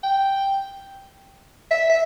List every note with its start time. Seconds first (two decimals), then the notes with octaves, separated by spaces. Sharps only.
0.03 G5
1.71 E5
1.89 E5